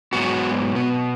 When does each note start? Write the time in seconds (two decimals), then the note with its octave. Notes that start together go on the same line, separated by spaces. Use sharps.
0.13 G#2 F#3 B3 F#4
0.75 B2 B3